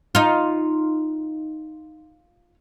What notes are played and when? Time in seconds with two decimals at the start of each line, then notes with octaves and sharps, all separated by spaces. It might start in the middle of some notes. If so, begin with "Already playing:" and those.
0.15 D#4 F4